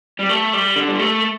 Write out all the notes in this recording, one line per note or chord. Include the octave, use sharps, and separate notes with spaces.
G3
A3
G3
D3
G3
A3